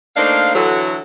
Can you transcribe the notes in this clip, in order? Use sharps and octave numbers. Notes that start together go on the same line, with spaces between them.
A3 A#3 D4 D#4 C5 F5
D3 E3 F#3 F#4 A4